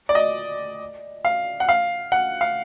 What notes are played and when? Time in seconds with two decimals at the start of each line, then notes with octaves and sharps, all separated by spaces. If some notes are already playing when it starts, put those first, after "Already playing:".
0.09 D5
0.15 D#5
1.25 F5
1.60 F#5
1.69 F5
2.12 F#5
2.41 F5